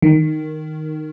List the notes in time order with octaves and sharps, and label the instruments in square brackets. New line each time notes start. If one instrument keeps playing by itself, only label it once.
[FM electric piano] D#3